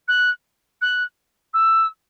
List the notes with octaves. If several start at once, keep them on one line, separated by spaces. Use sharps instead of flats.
F#6
F#6
E6